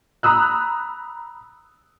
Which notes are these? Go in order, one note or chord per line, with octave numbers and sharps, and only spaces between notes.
A#5 B5 D#6 E6 F#6